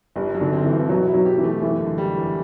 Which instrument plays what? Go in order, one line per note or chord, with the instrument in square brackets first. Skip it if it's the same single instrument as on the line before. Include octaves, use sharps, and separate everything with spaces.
[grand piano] G1 [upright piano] G3
[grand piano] F#3
[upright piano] D3
[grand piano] C4
[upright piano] E3
[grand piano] G2
[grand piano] B2 [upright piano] F#3
[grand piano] E4
[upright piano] F#3
[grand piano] G4
[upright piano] E3
[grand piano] A3
[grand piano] F#1 [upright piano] E3
[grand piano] D3
G3
E2